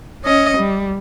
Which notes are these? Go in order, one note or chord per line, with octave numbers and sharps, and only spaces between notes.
C#4 D#5
G3